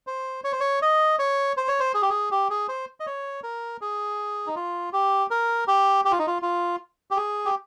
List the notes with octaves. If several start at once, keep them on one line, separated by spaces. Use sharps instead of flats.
C5
C#5
C5
C#5
D#5
C#5
C5
C#5
C5
G#4
G4
G#4
G4
G#4
C5
D#5
C#5
A#4
G#4
D#4
F4
G4
A#4
G4
G4
F4
D#4
F4
F4
G4
G#4
G4